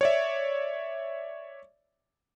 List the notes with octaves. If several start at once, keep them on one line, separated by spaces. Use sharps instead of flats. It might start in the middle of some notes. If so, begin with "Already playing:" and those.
C#5 D5 E5